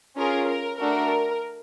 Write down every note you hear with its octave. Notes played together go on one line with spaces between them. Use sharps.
C#4 F4 G#4 A#4
A#4
A3 D4 F#4 A4 A#4